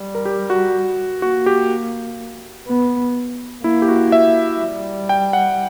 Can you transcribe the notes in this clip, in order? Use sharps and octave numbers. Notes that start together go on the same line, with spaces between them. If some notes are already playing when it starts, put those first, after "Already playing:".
Already playing: G3
A#4
G4
F#4
A#3 F#4
G4
B3
A#3 E4
G4
F#4
E5
G3
G5
F#5